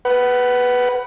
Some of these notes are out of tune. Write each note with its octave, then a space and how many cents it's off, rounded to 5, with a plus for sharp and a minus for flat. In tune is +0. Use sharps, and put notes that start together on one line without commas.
B4 +0 F#5 +25